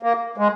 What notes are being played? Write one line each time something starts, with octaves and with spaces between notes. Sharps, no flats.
A#3
G#3